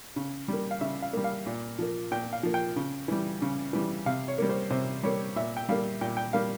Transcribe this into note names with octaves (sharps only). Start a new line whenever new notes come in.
C#3
G3 A#3
F5
C#3 E5
F5
G3 A#3
F5
A#2
F3 A#3
A#2 G5
F5
F3 A#3
G5
C#3
E3 G3
C#3
E3 G3
C3 F5
C#5
G3 A#3
C5
C3 C5
G3 A#3 C#5
A#2 E5
G5
G3 A#3 F5
A#2 G5
G5
G3 A#3 F5